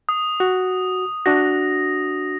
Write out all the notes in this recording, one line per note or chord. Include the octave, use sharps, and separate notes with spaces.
D#6
F#4
D4 F#4 A#6